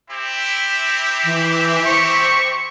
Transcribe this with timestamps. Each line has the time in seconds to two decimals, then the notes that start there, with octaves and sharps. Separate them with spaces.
0.10 C4 E4 G4
1.24 E3
1.86 C5 C#6